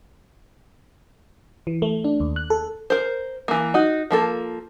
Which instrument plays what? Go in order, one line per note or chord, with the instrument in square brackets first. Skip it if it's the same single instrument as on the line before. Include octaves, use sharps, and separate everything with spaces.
[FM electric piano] E3
A3
D4
D#2
F#6
A4
[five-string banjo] A#4 C5
E3 A#3
D#4 F#4
F3 A#3 A4